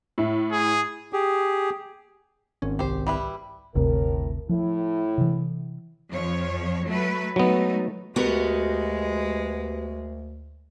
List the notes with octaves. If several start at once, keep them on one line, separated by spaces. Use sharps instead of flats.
A2 E5
G#4
G4 G#4
G#1 C#4
C2 G4 C5
G3 E4 B4
G1 D2 A2 C3 A#4
A2 F3 E4
C3 E3
F2 F3 C#5
F#3 A3 B4
F#3 G#3 A3 B3 D#4
D2 G#3 B3 F#4 G4 A#4